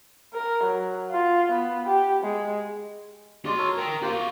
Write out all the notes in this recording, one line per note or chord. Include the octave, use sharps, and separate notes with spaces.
A#4
F#3
F4
B3
G4
G#3
G#3 F#4 D5 C6
A4 A#4 C#5
A#4 G5 A#5
A#3 F4 F#4 C5 F5
C#6 D6